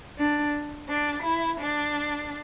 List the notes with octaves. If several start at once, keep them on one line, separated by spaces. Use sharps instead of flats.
D4
D4
E4
D4